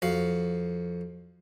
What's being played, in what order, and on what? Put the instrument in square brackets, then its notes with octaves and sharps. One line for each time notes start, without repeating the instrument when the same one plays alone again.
[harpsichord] F2 F#4 F5